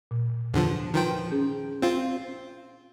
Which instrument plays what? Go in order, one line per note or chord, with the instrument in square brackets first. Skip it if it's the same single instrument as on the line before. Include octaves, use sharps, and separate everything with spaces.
[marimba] A#2
[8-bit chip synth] E2 D3 F3
[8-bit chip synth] D#3 F3 G5 [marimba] B4 A#5 C6
[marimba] C#4 G#4
[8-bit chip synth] C4 F4